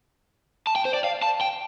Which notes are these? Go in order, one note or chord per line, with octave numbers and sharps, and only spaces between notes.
A5
G5
C5
D5
F5
A5
G5